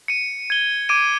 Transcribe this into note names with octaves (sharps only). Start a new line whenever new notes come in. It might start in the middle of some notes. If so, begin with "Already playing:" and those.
C#7 D#7
G#6 G7
D6 G#6 D7 D#7